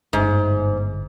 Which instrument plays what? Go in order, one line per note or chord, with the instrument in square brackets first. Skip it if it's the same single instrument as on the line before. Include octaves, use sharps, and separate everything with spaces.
[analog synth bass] G1 [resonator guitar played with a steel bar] G#2